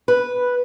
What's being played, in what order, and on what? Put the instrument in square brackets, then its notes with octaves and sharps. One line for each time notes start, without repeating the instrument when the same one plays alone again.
[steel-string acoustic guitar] B4